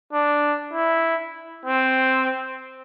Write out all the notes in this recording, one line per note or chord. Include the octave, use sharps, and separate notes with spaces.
D4
E4
C4